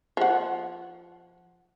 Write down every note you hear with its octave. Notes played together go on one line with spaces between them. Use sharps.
F3 F#5